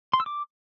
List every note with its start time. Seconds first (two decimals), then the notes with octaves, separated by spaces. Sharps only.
0.13 C6
0.20 E6
0.26 D6